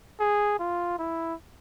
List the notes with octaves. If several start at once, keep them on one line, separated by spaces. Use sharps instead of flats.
G#4
F4
E4